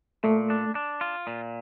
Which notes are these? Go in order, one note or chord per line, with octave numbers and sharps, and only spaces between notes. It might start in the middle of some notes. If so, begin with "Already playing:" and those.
A#2 A3
D4
D4
F4
A#2